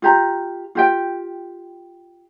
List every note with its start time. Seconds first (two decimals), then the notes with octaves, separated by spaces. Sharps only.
0.02 F4 G4 A#5
0.75 F4 G4 G5